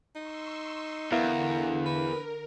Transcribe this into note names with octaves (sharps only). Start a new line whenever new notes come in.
D#4 C6 C#6 E6
E2 D3 B3 E4 A#4 F5
A#4 B4